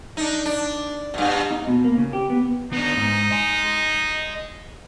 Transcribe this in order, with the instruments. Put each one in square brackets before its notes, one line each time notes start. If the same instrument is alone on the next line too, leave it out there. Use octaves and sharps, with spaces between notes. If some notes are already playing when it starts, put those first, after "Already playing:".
[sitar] D4 D#4
D4
G2 B2
[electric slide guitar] D#4
B2
A#3
C#3
G4
B3
[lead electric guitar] B3 D4 [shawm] D#4
[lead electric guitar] G#2
D#5 G#5